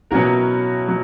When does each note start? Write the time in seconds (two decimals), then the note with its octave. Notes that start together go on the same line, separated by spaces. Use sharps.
0.11 B2 F#3 C#4 E4 F#4 A#4
0.88 F#3